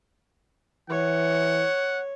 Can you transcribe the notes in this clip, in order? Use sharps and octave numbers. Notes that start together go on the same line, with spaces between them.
E3 C#5 F#5